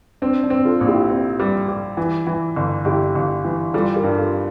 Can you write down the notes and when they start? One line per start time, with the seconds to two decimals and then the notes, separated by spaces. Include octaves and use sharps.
0.22 C4 D4
0.43 D4
0.50 C4
0.65 F4 A4
0.81 A#1
0.87 E4 G4
1.09 C4
1.39 G3
1.68 G3
1.97 E3
2.27 E3
2.56 G1
2.85 G1 E4 G4
3.15 G1
3.44 E3
3.73 G3 F4 A4
3.96 G4 A#4
4.03 G2
4.18 F4 A4